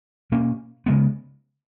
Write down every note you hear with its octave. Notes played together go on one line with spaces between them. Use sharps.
B2 A#3 C#4
C#3 G#3 B3